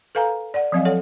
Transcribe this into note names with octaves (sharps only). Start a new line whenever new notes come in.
A4 B4 F5 G#5 A#5
D5 F#5
F3 F#3 C4 D#5 F5 G#5
A4 C#5 F#5